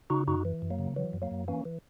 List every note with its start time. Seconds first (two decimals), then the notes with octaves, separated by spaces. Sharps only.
0.10 C#3 D#4 F#4
0.27 F#2 D#4 F#4
0.45 E3
0.62 F#2
0.70 F#3 A#3
0.79 C#3
0.96 E3 F#3
1.13 F#2
1.22 F#3 A#3
1.31 F#2
1.48 E3 A#3 C#4
1.65 E3